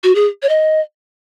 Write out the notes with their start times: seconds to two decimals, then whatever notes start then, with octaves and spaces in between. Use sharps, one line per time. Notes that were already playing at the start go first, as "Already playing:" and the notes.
0.04 F#4
0.15 G#4
0.43 C#5
0.49 D#5